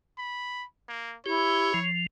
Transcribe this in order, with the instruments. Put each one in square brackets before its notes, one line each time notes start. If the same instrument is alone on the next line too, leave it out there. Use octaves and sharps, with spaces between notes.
[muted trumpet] B5
A#3
[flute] E4 [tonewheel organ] G4 [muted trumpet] C#5
[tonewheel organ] F3